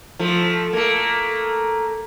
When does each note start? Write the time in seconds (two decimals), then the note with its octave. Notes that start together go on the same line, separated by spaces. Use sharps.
0.19 F3 A3
0.73 A3 A#3